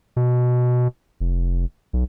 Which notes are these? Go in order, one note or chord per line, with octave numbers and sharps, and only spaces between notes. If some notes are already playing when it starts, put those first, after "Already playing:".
B2
F1
B1